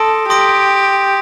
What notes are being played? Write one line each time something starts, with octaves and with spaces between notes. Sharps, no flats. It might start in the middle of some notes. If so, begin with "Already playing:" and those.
Already playing: A4 C6 D#6 A#6 D7
G4 C6 D#6 A#6 D7